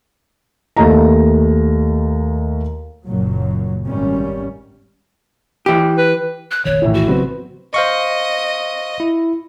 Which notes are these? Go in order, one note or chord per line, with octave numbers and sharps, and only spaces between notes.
D#2 A3 D#5 A5 A#5
F#1 F#2 A#2 F#3
G#1 G3 C#4
E3 G4
B4
F#6
F1 A#1 D#3 C#5
A2 E3
F#4
C#3 F#3 B3 C4
C5 D#5 F5 C#6
E4